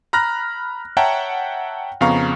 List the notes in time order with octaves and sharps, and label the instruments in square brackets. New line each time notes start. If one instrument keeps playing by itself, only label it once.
[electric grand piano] A#5 B5 F6 F#6 A#6
C#5 E5 F#5 G5 A5 A#5
F2 C#3 B3 F5 A#5 C#6